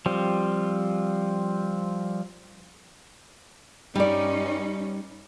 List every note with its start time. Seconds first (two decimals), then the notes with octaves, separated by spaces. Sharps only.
0.06 F3 G3 C4
3.95 G2 G3 C#4 D#4 D5